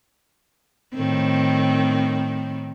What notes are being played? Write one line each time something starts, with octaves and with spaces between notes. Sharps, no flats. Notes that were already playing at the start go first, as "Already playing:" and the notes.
A2 D#3 C4